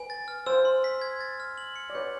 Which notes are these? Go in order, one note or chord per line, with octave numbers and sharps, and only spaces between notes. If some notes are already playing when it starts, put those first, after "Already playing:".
Already playing: B4 G#5
A6
F6
C5 E6
C6
B6
G#6
A6
F6
F#7
C#7
D5
B4 C#5 G6